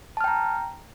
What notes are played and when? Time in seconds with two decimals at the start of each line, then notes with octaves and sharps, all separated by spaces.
0.17 A5
0.21 F6
0.24 G5
0.28 A#5